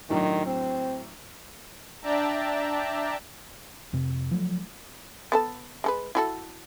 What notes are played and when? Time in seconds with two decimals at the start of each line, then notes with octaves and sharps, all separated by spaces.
0.10 A2 D#3 F#3 D4
0.46 C4
2.02 D4 D5 E5 G5 A5 A#5
3.93 F2 C3
4.31 F3 F#3 G#3 A3
5.32 B3 A4 A5
5.84 G#3 A4 B4
6.15 E4 F#4 A4